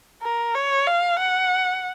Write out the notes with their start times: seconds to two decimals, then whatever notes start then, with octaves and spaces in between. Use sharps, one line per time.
0.22 A#4
0.55 C#5
0.87 F5
1.19 F#5